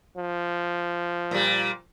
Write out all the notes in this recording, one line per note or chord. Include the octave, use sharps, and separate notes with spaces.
F3
A#2 G3